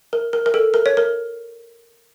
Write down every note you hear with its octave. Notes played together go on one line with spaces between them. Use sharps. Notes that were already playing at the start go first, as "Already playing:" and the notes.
A#4
A#4
A#4
A4
A#4
C#5
A#4